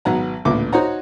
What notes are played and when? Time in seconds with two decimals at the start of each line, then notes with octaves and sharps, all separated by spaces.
0.05 G#1 B2 F#3 B3 F#5 A#5
0.45 A1 D2 A#2 B3 D6
0.73 D#4 F#4 C5 C#5 F#5 A#5